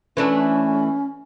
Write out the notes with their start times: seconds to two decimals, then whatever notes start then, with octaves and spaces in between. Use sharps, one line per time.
0.17 E3 A3 C#4 D4